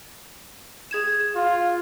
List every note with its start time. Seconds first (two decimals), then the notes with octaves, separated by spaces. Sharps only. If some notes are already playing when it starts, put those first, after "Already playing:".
0.91 G#4 G#6 E7
1.35 F4